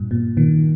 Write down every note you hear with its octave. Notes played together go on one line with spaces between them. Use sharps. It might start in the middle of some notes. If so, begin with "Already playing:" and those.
Already playing: G2 A#2
A#2
A#2 D#3